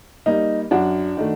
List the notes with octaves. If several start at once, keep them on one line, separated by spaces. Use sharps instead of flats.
G3 A#3 D#4
F#2 D4 F#4
D#3 A3